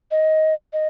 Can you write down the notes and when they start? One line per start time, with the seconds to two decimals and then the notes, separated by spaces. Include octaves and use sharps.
0.11 D#5
0.73 D#5